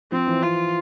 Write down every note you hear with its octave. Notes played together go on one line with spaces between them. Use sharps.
F3 C4
E3
F4